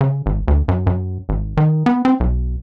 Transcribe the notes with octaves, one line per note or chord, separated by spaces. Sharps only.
C#3
G#1
D2
F#2
F#2
G#1
D#3
B3
C4
B1